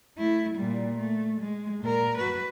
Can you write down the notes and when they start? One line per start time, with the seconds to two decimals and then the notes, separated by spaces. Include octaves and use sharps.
0.17 A3 E4
0.54 A#2 G3
0.97 A3
1.41 G#3
1.81 A#2 A#4
2.18 F#4 B4